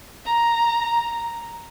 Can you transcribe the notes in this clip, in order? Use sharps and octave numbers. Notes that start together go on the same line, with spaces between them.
A#5